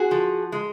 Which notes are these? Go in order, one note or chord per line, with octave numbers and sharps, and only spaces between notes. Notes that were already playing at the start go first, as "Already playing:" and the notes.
Already playing: F#4 G#4
F3
G#3